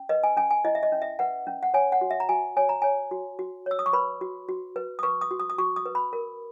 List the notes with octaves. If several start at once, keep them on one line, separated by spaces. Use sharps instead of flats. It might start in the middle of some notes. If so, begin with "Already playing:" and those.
Already playing: C#4
B4 D#5
G#5
C#4 G#5
G#5
E4 D#5
E5
D#5
C#4
E5
B4 F#5
C#4
F#5
C#5 G#5
F#5
F#4
E5
A#5
F#4 G#5
C#5 G#5
A#5
C#5 G#5
F#4
F#4
C#5 E6
D#6
C#6
B4 B5
F#4
F#4
B4
D#6
B4 C#6
D#6
F#4
D#6
D#6
F#4 C#6
D#6
B4
B5
A#4